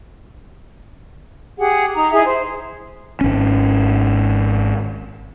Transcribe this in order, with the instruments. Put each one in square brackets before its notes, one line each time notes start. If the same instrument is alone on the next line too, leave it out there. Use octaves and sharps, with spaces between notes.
[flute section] G4 G#4 F#5
D#4 A#5
D#4 E4 G#4 E5
C5
[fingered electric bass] G#1 C#4